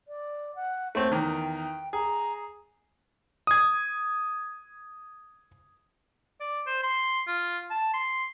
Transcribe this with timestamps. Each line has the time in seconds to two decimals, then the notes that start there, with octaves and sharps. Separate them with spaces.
0.08 D5
0.55 F#5
0.95 A3 C4 C#5
1.12 E2 D#3 G5
1.93 G#4 A#5
3.47 D#6 G#6
6.40 D5
6.67 C5
6.83 C6
7.27 F4
7.70 A5
7.94 C6